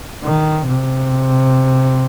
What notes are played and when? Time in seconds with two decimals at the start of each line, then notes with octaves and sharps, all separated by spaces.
0.24 D#3
0.67 C3